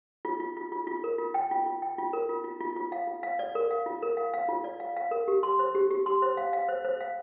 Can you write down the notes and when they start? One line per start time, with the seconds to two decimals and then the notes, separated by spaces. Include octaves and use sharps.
0.25 F4
0.40 F4
0.57 F4
0.72 F4
0.87 F4
1.04 A#4
1.18 F4
1.34 G5
1.51 F4
1.66 F4
1.82 G5
1.98 F4
2.13 A#4
2.29 F4
2.44 F4
2.60 F4
2.76 F4
2.92 F5
3.08 F4
3.23 F5
3.39 D5
3.55 A#4
3.71 F5
3.86 F4
4.02 A#4
4.17 F5
4.34 F5
4.49 F4
4.64 D5
4.80 F5
4.97 F5
5.11 A#4
5.28 G4
5.43 C6
5.59 C5
5.75 G4
5.91 G4
6.06 C6
6.22 C5
6.37 F5
6.53 F5
6.68 C5
6.85 C5
7.01 F5